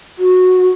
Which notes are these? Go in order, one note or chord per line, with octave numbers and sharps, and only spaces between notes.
F#4